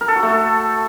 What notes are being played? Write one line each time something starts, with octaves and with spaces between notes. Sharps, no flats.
A#4
A4
F#4
A3
A4